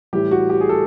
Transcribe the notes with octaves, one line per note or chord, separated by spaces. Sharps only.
A2 E3 G3 G4
F#4
G4
G#4
A4